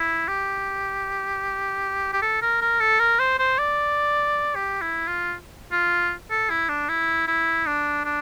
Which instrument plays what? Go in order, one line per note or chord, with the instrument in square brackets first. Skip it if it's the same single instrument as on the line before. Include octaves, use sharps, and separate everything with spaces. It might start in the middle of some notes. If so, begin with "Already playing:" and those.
Already playing: [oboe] E4
G4
G4
A4
A#4
A#4
A4
A#4
C5
C5
D5
G4
E4
F4
F4
A4
E4
D4
E4
E4
D4
D4